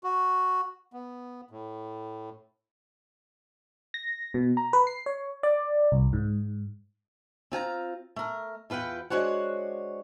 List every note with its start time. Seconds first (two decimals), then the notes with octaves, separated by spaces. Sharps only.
0.04 F#4
0.93 B3
1.51 A2
3.94 A#6
4.34 B2
4.57 A#5
4.73 B4
4.87 C7
5.06 C#5
5.43 D5
5.92 C2
6.13 G#2
7.52 C4 F4 G#5 A#5
8.16 A3 A#4
8.70 E2 F4 B4 F#5 G5
9.10 G#3 D4 F#4 C5 C#5 F#5